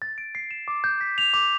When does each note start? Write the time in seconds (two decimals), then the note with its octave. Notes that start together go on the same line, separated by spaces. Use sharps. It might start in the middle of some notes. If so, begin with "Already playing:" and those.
0.02 A6
0.18 D7
0.35 C7
0.51 E7
0.68 D6
0.84 G6
1.01 B6
1.18 F7
1.34 D6